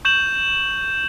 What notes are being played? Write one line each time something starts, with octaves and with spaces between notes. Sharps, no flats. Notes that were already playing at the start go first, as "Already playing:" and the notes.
C#6 G6 E7 F#7